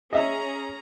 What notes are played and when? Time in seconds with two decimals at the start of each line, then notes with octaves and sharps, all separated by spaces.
0.13 C#4 G#4 D#5 E5 A#5